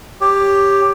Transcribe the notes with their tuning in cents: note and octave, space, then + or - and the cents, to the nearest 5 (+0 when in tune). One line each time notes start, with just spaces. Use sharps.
G4 +5 C#5 +5